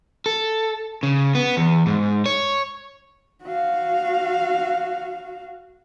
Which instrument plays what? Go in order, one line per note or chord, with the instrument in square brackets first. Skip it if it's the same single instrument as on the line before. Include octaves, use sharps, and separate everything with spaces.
[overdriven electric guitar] A4
C#3
B3
E2
G#2
C#5
[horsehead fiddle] F#4 F5